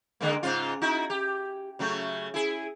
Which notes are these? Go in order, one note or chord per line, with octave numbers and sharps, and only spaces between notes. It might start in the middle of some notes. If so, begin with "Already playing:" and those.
D3 G#3 A#3
G#2 C#3 F4
D#4 E4 F#4
G4
C#3 F#3 A3
E4 G#4